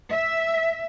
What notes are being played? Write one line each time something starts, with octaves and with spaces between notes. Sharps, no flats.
E5